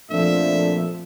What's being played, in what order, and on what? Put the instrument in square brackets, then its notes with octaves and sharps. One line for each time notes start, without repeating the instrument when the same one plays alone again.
[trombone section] F2 A#2 A3 [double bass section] F3 [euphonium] D4 [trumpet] E5